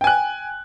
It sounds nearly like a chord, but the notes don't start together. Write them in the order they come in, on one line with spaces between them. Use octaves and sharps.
G5 G#5 F#6